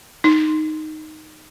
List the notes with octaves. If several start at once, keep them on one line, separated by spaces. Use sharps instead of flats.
D#4